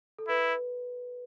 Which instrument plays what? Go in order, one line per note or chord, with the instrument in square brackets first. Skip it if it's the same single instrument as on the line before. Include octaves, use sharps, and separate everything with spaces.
[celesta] A4
[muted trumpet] E4 [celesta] B4